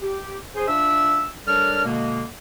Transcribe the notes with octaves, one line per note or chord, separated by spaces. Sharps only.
G4
G#4 C5
D4 F4 E5 E6
G3 D4 A4 A#4 C#5 F6
B2 D3 G#3 A#3